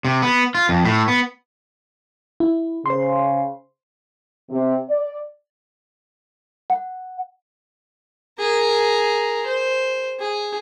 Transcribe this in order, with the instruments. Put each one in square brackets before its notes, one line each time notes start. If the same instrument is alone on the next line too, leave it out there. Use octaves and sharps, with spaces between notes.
[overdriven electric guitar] C3
B3
F4
F2
A2
B3
[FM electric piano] E4
[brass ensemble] C#3 [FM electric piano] C5 C6
[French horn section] C3
D5
[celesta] F#5
[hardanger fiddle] G#4 A#4
C5
G#4